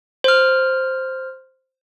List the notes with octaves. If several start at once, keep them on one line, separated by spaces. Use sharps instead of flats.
C5 F6